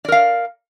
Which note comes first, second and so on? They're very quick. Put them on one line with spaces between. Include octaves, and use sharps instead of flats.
D5 A#4 F5